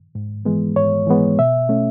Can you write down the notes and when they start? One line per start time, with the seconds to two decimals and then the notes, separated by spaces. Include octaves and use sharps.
0.15 G#2
0.45 E3 G#3 B3
0.76 G#2 C#5
1.07 E3 G#3 B3
1.38 B2 E5
1.69 A3 C#4